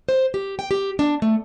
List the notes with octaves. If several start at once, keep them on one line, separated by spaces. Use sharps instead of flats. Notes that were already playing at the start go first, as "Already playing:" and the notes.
C5
G4
G5
G4
D4
A3